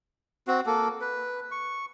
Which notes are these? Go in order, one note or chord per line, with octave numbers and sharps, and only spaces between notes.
C4 F#4
A#3 A4
B4
C#6